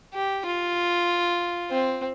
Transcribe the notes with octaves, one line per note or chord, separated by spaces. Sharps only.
G4
F4
C4